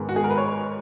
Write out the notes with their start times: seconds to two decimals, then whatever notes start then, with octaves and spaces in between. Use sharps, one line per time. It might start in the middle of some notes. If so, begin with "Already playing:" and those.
Already playing: G#2 D#3 G#3 B3
0.09 F#4
0.16 G#4
0.24 A#4
0.30 B4
0.38 C#5